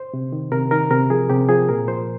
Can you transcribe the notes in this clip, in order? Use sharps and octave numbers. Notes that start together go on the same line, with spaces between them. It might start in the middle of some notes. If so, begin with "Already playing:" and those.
Already playing: C5
C3
D#3
C3 A#4
D#3 A#4
C3 A#4
F3 G#4
C3 G4
F3 G#4
A#2 A#4
F3 C5